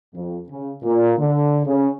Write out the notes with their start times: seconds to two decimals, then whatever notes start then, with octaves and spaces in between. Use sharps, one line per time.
0.14 F2
0.49 C#3
0.82 A#2
1.18 D3
1.66 C#3